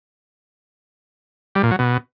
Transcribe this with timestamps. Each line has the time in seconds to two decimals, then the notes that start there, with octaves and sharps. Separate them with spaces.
1.55 G3
1.63 A#2
1.71 F#3
1.79 B2